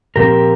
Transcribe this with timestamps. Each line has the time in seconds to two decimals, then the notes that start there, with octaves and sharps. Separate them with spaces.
0.16 A#2 F3 C4 G4 A#4